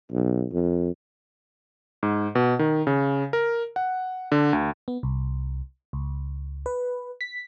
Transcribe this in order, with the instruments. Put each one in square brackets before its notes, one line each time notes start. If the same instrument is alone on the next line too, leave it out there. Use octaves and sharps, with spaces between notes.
[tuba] B1
F2
[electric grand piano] G#2
B2
D#3
C#3
A#4
F#5
D3
D2
[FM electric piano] B3
C2
C#2
B4
B6